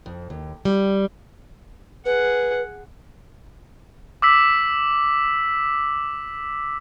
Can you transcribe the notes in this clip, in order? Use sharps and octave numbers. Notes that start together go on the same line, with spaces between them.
F2
D#2
G3
G#4 B4 F#5
D6 E6 B6